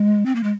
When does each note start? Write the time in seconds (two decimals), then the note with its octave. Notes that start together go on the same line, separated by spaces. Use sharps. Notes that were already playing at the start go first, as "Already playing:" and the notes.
Already playing: G#3
0.26 C4
0.35 A#3
0.43 G#3